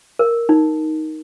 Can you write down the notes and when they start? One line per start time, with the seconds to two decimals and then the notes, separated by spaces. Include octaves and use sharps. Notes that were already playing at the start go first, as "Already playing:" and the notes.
0.19 A#4
0.49 D#4